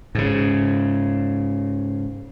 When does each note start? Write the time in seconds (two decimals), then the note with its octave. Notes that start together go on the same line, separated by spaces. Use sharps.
0.15 G#2 C#3